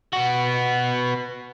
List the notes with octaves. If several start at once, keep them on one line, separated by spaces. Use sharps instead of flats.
B3 F#4